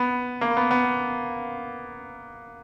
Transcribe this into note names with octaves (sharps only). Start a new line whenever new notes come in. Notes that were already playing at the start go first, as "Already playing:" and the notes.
Already playing: B3
A#3
B3
B3